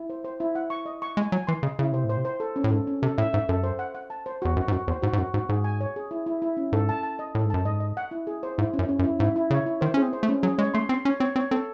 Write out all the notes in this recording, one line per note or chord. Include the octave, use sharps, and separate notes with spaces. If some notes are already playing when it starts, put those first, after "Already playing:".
Already playing: E4
C5
C5
E4
F#5
C#6
D#5
C#6
G#3 G#5
F#3 G#5
E3 C6
C#3 D#5
C#3 E4
C3 C5
A2
C5
C3
C5
A4
C#4
A2
G#2 A4
C#4
C3 A4
A2 E5
G#2 E5
F#2 A4
C5
F#5
F#5
A5
C5
E2 F#4
F#2 F#4
G#2
F#2 F#4
E2 C5
G#2 F#4
G#2
F#2 F#4
G#2 F#4
G#2 G#4
G#5
C#5
G#4
E4
E4
E4
C#4
G#2 A4
A5
A5
D#5
A2 A4
G#2
F#2 A5
G#2 D#5
D#5
F#5
E4
G#4
C5
G#2 E4
C#4
F#2
C#4
F#2
E4
G#2 E4
E4
C#3 C#5
E4
D#3 C5
C#4
G#4
C4
C5
A3
C#4
F#3 G#4
G#3 C#5
A3 C6
C4 C6
C#4 C#5
C4 C#5
C4 C#5
C4 A4